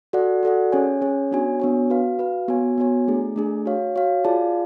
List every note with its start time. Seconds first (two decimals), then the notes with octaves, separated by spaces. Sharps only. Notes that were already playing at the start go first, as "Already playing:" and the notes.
0.13 F#4 A4 D5 F#5
0.43 F#4 A4 D5 F#5
0.72 C#4 G#4 C#5 G#5
1.01 C#4 G#4 C#5 G#5
1.31 B3 D4 F#4 C#5 G#5
1.60 B3 D4 F#4 C#5 G#5
1.90 F#4 B4 F5
2.19 F#4 B4 F5
2.48 B3 F#4 C#5 G#5
2.78 B3 F#4 C#5 G#5
3.08 A3 D4 G#4
3.36 A3 D4 G#4
3.66 F#4 C#5 F5
3.96 F#4 C#5 F5
4.24 F4 G#4 D5 F5 A5